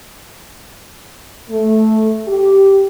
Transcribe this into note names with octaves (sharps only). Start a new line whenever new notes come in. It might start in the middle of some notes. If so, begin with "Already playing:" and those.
A3
G4